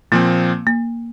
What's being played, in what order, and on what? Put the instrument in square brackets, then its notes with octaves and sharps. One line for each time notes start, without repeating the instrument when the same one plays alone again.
[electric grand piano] A#2 F3 C4 [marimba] A#3
[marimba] A#3